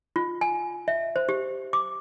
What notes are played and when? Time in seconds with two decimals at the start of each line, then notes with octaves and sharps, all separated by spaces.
0.16 F4
0.41 G#5
0.88 E5
1.16 C5
1.29 G4
1.73 D6